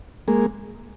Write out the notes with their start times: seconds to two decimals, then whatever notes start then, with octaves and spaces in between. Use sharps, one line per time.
0.28 G#3 A#3